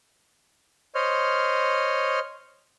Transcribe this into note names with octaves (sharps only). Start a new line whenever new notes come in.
C5 C#5 D#5 F6